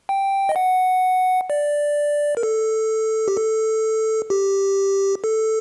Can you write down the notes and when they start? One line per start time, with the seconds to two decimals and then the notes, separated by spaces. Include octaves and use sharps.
0.09 G5
0.49 D#5
0.56 F#5
1.50 D5
2.37 A#4
2.43 A4
3.28 G4
3.37 A4
4.30 G4
5.24 A4